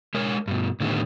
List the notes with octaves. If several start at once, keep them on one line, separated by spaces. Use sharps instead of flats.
G#3 A#4 C#5
G2 B2
A2 D3 D#3 F#3 G3 B3